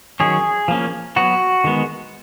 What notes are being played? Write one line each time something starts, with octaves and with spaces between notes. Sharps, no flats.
D#3 F#3 C#4 G#4
F3 A#3 C#4
F#3 B3 F#4
D#3 G#3 B3